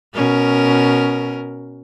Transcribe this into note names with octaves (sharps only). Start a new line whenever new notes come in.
B2 C#4 A#4